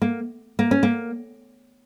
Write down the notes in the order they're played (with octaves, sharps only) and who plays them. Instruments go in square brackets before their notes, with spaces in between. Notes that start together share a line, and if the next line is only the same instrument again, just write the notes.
[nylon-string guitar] A#3
A#3
C#4
A#3